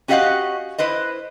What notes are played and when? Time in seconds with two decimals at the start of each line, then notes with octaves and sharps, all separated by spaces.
0.08 C#4 F#4 G4 D#5 F5 F#5
0.78 E4 B4 C5 D#5